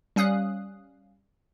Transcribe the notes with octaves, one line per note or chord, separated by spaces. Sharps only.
G3 C#4 F5 D#6 F#6